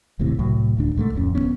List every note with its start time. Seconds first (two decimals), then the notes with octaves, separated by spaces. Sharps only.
0.19 E1 D#2 A2 C3
0.39 C2 A2 F#3
0.77 D1 D2 D4
0.96 C2 G#2 G3 A3
1.14 D1 F2 G#3 C#4
1.35 E1 G2 B3 C#4